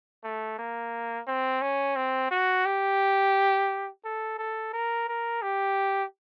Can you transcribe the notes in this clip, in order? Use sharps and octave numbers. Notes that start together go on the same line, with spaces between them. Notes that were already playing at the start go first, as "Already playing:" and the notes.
A3
A#3
C4
C#4
C4
F#4
G4
A4
A4
A#4
A#4
G4